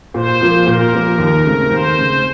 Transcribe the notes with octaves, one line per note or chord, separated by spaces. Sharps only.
A#2 C5
F3 A#3 F4
A#2 A#4
F3 A#3 F4
D#2
C#3 A3 C4
D#2 C5
C#3 A3 C4